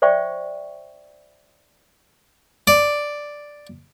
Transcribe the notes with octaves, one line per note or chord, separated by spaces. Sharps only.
C5 D5 E5 G5 C#6
D5